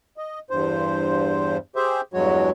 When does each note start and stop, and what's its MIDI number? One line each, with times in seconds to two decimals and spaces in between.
0.17 0.39 75
0.50 1.57 40
0.50 1.57 43
0.50 1.57 72
1.76 2.01 67
1.76 2.01 68
1.76 2.01 72
1.76 2.01 76
2.14 2.50 40
2.14 2.50 43
2.14 2.50 54
2.14 2.50 56
2.14 2.50 66
2.14 2.50 73